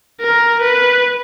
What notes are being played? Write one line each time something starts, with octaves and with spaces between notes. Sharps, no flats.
A#4
B4